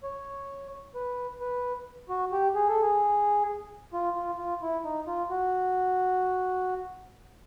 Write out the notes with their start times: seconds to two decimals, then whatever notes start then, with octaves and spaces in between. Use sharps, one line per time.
0.03 C#5
0.95 B4
1.41 B4
2.09 F#4
2.32 G4
2.55 G#4
2.68 A4
2.82 G#4
3.93 F4
4.15 F4
4.38 F4
4.62 E4
4.84 D#4
5.07 F4
5.30 F#4